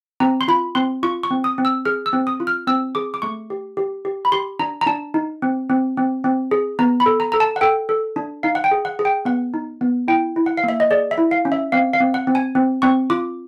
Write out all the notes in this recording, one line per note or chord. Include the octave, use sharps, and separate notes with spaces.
C4 A#5
C6
F4 B5
C4 C6
F4 C#6
C#6
C4
D#6
C4
E6
G#4 F6
E6
C4
D#6
F4
F6
C4 E6
G#4 D6
D6
A3 C#6
G4
G4
G4
B5
G4 C6
D4 A#5
A#5
D4 A5
D#4
C4
C4
C4
C4
G#4
B3 A#5
B5
A4
A#5
A4 A#5
A5
F#5
A4 G5
A4
D4
D#4 F5
F#5
G5
G#4
F#5
G#4
G5
B3 F#5
D#4
B3
E4 G5
E4
F#5
F5
A#3 E5
D#5
G#4 D5
E5
E4
F5
C#4
E5
C4 F5
F5
C4
F#5
C4
G#5
C4
C4 C#6
F4 D6